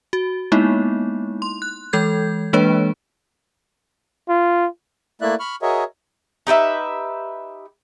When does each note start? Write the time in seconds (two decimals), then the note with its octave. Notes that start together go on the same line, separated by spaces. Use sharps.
0.13 F#4
0.52 G#3 A#3 B3 D#4 E4
1.42 C6
1.62 F#6
1.93 E3 G#3 A4 G6 G#6
2.53 E3 G#3 A#3 D4 B4 C#5
4.29 F4
5.21 A3 A#3 E4 D5 E5 F#6
5.40 B5 C#6 F6
5.62 F#4 G#4 A#4 C#5 D#5 E5
6.47 D#4 G4 B4 E5